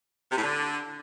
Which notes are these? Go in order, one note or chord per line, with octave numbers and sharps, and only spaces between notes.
C3
A2
D3